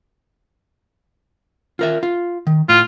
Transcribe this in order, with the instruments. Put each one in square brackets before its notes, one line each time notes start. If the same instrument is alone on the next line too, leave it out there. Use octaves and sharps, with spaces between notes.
[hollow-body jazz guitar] F4 A#4 E5
F4
D#3
[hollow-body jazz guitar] A2 [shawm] F4